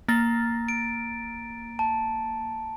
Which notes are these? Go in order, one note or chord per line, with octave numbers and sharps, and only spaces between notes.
A#3 A#5 A6
D7
A5